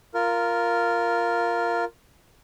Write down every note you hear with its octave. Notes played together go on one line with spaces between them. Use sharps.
F4 A#4